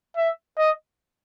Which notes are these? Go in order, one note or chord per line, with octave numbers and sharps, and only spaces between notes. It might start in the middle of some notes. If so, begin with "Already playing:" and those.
E5
D#5